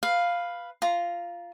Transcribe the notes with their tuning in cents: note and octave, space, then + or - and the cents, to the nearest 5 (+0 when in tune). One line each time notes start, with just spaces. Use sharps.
B4 +0 F5 +0
F4 -10 A#5 +10